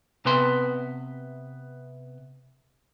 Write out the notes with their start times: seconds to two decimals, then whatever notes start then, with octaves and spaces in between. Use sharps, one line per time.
0.25 C3 B3 B4 C6